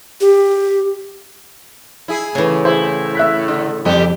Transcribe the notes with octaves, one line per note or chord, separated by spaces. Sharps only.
G4
E4 G#4
A2 C#3 E3
E4 G#4 C5
E5 F#6 B6
D3
F2 G3 G4 A4